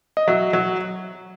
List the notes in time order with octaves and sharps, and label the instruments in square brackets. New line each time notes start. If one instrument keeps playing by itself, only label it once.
[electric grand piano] D#5
[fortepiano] F#3 [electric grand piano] E5
[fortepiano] F#3